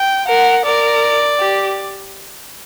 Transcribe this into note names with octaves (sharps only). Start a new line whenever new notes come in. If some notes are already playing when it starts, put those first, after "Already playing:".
Already playing: G5
A#4 F#5
A#4 D5
G4